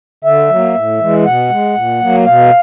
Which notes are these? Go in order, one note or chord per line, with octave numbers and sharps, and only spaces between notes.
D3 E5
F#3
A#3
A2
E3 G#3
B2 F#5
G#3
A#2
F#3 A#3
B2 F5